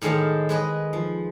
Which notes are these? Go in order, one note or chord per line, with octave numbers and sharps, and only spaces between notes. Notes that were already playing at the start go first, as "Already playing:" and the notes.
A2 D#3 G#3 A4 C5 F5
G#3 B4 D#5
F3